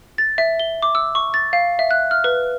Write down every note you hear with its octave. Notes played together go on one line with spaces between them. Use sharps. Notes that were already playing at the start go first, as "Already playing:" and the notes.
A6
E5
G7
D6
E6
C#6
A6
F5
E5
F#6
F6
B4